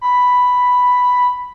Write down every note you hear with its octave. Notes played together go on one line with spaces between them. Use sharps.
B5